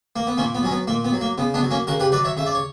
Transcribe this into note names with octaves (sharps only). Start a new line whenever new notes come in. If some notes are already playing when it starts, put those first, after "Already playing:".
A#3
B3
A#2 A#3 C#4
B3
F#3 C#4
B3
A#2 A#3
B3
F#3
A#3
C#3 B3
B3 D4
F#3
A#3 C#4
C#3 F#4 A#4
G4 B4
F#3 B4 D5
C#5 E5
C#3 E5
D5
C#5